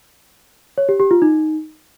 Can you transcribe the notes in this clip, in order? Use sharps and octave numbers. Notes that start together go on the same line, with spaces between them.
C#5
G4
G4
F4
D#4